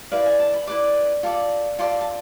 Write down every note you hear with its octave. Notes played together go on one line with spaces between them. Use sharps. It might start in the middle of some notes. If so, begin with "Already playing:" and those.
E4 B4 D5 F5
G#5
A5
B5
E4 B4 D5 D6
F4 A4 D5
F4 A4 D5 C6
A5